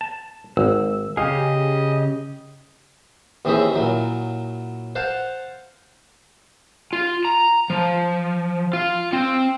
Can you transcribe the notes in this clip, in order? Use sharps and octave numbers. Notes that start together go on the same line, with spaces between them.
A5
G#1 E6
C#3 G4 G#4 D#5 F5
D#2 E3 C4 C#4 G#4 E5
A#2 F#3 E4
C5 F5 F#5 A5
F4
A#5
F3
F4
C4